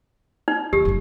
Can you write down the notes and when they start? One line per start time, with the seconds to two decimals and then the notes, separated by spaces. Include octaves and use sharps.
0.48 D#4
0.73 D#2 G4
0.85 F#1 C#2